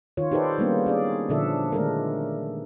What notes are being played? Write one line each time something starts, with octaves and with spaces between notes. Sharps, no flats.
D#3 F4 C#5
D#4 G4 A4 B4 C5 D5
G3 G#3 A#3 B3 C#4 D4
C#4 G#4 D5
A#2 D3 F3 D4 A4 E5
D#3 G#3 A3 D4 A4 A#4